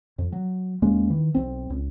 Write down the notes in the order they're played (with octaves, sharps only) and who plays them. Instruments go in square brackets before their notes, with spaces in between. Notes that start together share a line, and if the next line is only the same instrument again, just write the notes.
[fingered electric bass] F2
F#3
D#2 G#3 A#3 C#4
D#3 E3
B1 C4
C#2